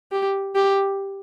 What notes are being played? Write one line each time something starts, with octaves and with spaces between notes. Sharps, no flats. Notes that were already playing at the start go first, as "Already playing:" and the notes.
G4
G4